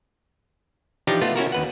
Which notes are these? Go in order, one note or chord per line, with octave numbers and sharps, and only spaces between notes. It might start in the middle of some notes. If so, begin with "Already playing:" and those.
E3 F3 D4 D#4 G4
A3 B3 F4
C#4 E4 F#4 A#4
D#2 B4 F#5